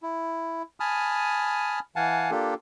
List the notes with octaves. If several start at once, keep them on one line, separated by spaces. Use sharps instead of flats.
E4
G#5 A5 B5 D#6 F6
E3 F5 F#5 G#5 A5
A#3 D4 F4 G4 A4